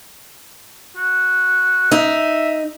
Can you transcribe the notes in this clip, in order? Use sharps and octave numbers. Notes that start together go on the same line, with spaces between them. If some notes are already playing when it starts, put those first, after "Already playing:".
F#4
D#4 E5